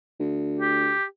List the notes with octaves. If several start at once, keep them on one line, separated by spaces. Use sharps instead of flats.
D2
G4